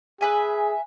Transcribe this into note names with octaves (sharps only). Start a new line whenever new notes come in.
G#4 B4 E5 G#5